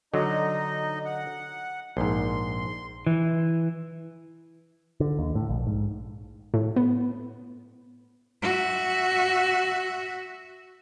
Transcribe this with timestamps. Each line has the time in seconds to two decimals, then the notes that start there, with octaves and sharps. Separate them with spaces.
0.14 D3 F#3 D#4 D#5
1.05 F#5
1.97 A#1 G#2 C6
3.06 E3
5.00 D3
5.19 D#2
5.35 A2
5.49 A#1
5.67 G#2
6.54 A2
6.76 B3
8.42 F#4 E5